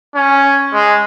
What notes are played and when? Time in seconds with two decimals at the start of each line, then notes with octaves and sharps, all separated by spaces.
0.15 C#4
0.73 G#3